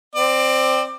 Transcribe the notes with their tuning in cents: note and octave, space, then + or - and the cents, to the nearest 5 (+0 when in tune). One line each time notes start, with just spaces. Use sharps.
C4 +0 D5 +20